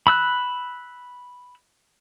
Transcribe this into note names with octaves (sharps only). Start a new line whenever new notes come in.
B5 E6 F#6